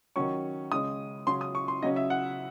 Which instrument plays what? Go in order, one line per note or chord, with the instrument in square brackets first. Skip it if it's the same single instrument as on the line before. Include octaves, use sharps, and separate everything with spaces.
[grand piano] D#3 F#3 C#4 C#6
C#3 G#3 C#4 D#6
C#3 F#3 C#4 C6
D#6
C#6
C6
C#3 F#3 C#4 D#5
E5
F#5